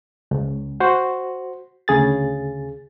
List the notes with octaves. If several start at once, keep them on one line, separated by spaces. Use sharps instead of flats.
C#2
F#4 C5
D2 C#3 G#4 A6